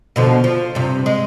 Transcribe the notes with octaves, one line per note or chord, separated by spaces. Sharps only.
B2 D3 F3
F3
G2 C3
G#3